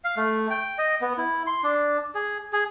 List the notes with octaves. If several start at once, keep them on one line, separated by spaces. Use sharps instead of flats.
F5
A3
G5
D#5
B3
E4
C6
D4
G#4
G#4